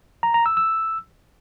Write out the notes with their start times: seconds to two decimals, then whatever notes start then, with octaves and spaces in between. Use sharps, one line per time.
0.23 A#5
0.34 A#5
0.46 E6
0.57 E6